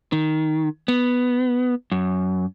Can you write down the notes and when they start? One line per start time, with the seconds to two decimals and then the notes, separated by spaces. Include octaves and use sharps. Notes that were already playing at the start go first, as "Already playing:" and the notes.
0.12 D#3
0.88 B3
1.92 F#2